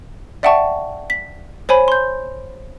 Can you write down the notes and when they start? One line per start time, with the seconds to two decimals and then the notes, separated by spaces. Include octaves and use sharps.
0.43 D5 E5 F#5 G5 A5 C#6
1.10 B6
1.69 C5 C#5 G#5 B5
1.88 C6 G6